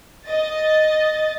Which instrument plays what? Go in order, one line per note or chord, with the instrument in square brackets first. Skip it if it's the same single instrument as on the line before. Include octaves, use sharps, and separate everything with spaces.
[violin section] D#5 A6